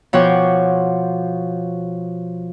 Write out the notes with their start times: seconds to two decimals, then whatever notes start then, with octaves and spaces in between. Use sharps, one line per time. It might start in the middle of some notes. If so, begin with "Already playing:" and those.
0.13 B2 F3 C#5 F#5 G5 D6